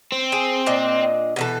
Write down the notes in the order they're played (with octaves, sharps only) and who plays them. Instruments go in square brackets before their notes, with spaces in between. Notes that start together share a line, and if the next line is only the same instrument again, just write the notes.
[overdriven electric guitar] C4
[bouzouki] G#4
A#2 D4 D#5
B2 E3 A4